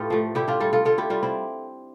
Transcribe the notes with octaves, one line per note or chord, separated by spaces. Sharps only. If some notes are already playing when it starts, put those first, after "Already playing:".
Already playing: A2 F4 G4 A4 B4
F3 A3
D3 E4 G4
D4 F4
G3 F4 A4
F4 A4
D3 F4 A4
E4 G4
G3 D4 F4
C4 E4